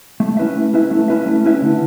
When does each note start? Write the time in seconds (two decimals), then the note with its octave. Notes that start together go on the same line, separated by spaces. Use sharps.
0.20 A3
0.37 C#4 E4 B4 E5
0.56 A3
0.73 C#4 E4 B4 E5
0.91 A3
1.08 C#4 E4 B4 E5
1.26 A3
1.44 C#4 E4 B4 E5
1.62 D3